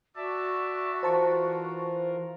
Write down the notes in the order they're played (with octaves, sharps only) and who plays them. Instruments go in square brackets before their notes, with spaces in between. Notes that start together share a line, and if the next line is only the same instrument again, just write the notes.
[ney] F#4 [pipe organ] D5 E5 A5
[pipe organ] E3 F4 A#4 [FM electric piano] C5 A5 C#6